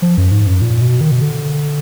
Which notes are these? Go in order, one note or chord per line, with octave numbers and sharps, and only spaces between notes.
F3
F#2
G#2
F#2
A#2
B2
D#3
B2
D3